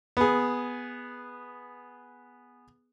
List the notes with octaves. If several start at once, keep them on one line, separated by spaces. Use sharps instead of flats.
B3 G#4